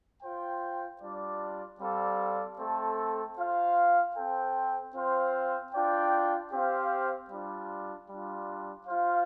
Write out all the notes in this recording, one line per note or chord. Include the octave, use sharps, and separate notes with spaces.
F4 C5 G5
G3 D4 F4 D5
G3 C4 A4 D5 F5
A3 C4 A4
F4 C5 F5
C4 A4 C5 G5
C4 F4 C5 F5
D4 F4 D5 G5
C4 G4 C5 F5
G3 D4 F4
G3 D4 F4
F4 C5 F5